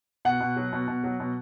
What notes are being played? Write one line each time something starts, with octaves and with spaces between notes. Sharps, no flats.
B2 F#5
B2
F#3
B2
B2
F#3
B2